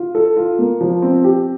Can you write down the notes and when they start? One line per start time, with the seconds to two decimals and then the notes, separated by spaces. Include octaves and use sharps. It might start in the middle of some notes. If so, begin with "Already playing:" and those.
Already playing: F4
0.15 A4
0.36 F4
0.59 A#3
0.81 F3
1.02 C4
1.24 G4